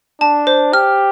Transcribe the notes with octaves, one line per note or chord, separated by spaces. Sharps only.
D4 A5
C5
G4 F6